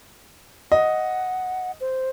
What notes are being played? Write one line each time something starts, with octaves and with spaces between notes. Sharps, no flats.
D#5 F#5
C5